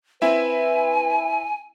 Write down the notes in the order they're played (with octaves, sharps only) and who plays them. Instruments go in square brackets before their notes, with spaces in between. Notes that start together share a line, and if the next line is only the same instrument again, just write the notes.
[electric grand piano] C4 E4 E5 [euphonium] B4 [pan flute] G#5